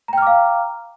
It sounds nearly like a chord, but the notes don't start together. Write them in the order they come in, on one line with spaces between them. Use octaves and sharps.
A#5 G5 F6 D6 F5